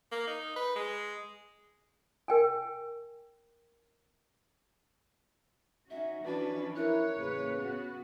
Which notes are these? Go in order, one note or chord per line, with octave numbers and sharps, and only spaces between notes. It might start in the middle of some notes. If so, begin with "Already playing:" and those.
A#3
D#4
B4
G#3
A#4 G5 G#5
C#4 D#4 F#4 E5
E3 F3 C#4 D4 F#4 B4
E4 A#4 C#5 F#6
A1 C#3 A#3 B4
B3 F#4